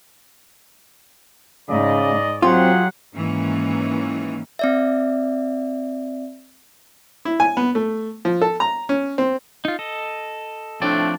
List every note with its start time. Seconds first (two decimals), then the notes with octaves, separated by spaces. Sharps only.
1.69 G#2 C#3 D5 D#5
2.43 F#3 C4 F4 G4 G#4 F#5
3.14 G#2 D#3 E3 A#3 C#4
4.59 C4 D5 E5
7.25 E4
7.40 G#5
7.57 B3
7.75 A3
8.25 F3
8.42 A4
8.60 A#5
8.89 C#4
9.18 C4
9.65 D#4 F4
9.79 A4 D#5
10.81 A2 F3 A3 C4 D4 D5